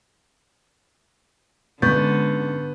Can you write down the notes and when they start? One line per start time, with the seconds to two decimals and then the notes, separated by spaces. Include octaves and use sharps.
1.82 G#2 D3 G#3 B3 C#4 C#6 G6 A6